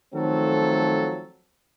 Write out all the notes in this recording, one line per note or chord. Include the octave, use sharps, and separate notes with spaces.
D#3 F3 F#3 A3 C4 A4